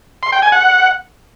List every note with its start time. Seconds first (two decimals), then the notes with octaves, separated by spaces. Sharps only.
0.23 C6
0.33 G5
0.42 G#5
0.52 F#5